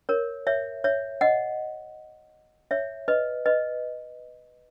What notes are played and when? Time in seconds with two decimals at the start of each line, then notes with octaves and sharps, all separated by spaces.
0.09 A#4 C#5
0.47 C#5 E5
0.84 C#5 E5
1.21 D#5 F#5
2.71 C#5 E5
3.08 B4 D#5
3.46 B4 D#5